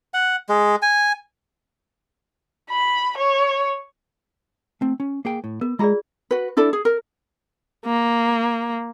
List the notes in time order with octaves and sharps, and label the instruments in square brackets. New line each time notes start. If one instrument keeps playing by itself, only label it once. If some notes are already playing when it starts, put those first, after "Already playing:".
[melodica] F#5
G#3
G#5
[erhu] B5
C#5
[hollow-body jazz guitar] A3 C4
C#4
A#3 G#4 G5
A2
[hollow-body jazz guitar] B3 [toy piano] A#4
[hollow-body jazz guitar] G#3 A#5 [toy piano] F4 G#4 D5
[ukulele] F#4 B4
D4 E4 A4 D5
G#4
A#4
[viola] A#3